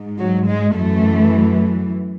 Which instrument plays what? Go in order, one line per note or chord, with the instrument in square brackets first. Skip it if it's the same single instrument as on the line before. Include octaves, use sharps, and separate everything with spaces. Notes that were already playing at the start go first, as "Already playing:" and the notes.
Already playing: [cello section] G#2
F#3
G#3
F#2 E3 A3